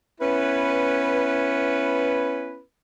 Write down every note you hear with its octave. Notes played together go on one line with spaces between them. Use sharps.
B3 C#4 E4 B4